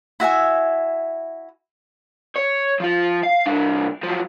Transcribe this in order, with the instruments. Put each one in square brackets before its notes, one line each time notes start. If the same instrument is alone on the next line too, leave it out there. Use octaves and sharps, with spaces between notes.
[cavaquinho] E4 F#4 E5 G#5
[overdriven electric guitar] C#5
F3 F4
F5
C2 D4
F3 F#3